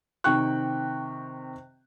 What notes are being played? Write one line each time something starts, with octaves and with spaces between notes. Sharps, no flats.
C3 D#3 G5 C#6 F#6